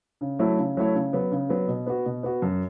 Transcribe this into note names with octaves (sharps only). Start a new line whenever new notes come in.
C#3
F#3 A3 E4 C#5
C#3
F#3 A3 E4 C#5
C#3
F#3 B3
C#3
F#3 B3
B2
B3 F#4
B2
B3 F#4
F#2